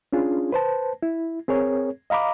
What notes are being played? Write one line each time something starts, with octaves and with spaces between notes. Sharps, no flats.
C#4 D4 F4 G#4
B4 C5 A5
E4
C4 G#4 A#4 C#5
D#5 F5 A#5 B5 D6